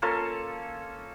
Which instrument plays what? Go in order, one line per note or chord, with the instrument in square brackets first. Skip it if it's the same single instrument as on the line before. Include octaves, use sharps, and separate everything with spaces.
[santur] A#3 C#4 F4 A4